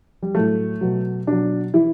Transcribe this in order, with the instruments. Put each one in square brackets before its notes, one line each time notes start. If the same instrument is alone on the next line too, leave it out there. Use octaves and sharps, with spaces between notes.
[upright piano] G3
A2 F#3 A3
B2 F#3
B2 F#3 D4
E3 E4